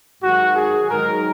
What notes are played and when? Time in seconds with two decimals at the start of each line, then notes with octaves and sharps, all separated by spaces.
0.23 G#2 D#3 F#3 F#4
0.56 G#4
0.90 G#2 D#3 F#3 A#4